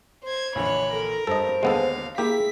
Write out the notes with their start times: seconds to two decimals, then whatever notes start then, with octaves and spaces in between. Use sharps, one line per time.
0.24 C5 G#6
0.55 A#1 D3 E3 C#5 B5
0.93 A4 A#4
1.27 G2 A4 C5 D#5
1.63 D#2 D3 G#3 B3 A4 F5
2.18 A#3 E4 G4 G#4 B6